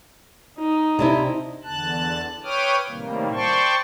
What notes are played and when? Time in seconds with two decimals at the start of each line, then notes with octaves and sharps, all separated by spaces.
0.58 D#4
0.99 C3 D4 E4
1.63 E2 D3 A5 F#6
2.44 B4 C#5 G5 D6 D#6 F6
2.89 A2 C3 D#3 G3 A#3
3.33 C5 D5 G5 A5 C6 C#6